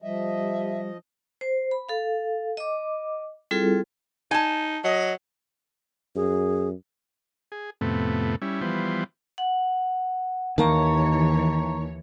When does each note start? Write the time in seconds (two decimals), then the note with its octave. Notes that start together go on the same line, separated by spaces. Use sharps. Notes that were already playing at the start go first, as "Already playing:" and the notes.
0.02 F3 G3 D#5 E5
1.41 C5
1.71 B5
1.89 A4 F5
2.57 D#5 D6
3.51 G3 C4 E4 F4 G#4 A4
4.31 D#4 G#5 A5
4.84 F#3 D#5
6.16 F#2 G#4
7.52 G#4
7.81 F2 A2 C3 A3 B3
8.42 G3 C#4 E4
8.61 E3 F3 G3 B3 C5
9.38 F#5
10.58 D#2 D#3 E3 A#3 C#5 A5 A#5 C#6